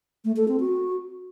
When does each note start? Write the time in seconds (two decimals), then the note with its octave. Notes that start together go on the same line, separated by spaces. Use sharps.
0.25 A3
0.36 A4
0.48 C4
0.60 F#4